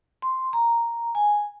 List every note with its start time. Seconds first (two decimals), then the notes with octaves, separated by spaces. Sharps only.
0.22 C6
0.53 A#5
1.15 G#5